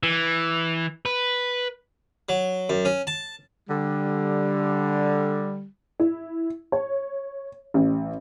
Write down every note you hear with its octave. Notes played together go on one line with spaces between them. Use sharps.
E3
B4
F#3
F#2
C#4
A5
D3 G3
E4
C#5
A1